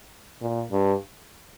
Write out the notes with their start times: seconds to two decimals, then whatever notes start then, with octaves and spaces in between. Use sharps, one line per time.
0.41 A#2
0.71 G2